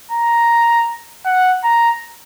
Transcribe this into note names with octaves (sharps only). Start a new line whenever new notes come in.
A#5
F#5
A#5